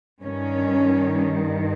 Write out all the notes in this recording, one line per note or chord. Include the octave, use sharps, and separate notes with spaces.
G2 D#3 C#4